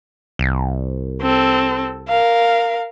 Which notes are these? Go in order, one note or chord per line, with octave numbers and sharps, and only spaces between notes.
C2
C4 A4
A#4 F5